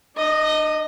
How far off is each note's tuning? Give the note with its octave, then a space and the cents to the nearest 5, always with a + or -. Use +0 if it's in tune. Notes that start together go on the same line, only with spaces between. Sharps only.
D4 +45 D#5 -5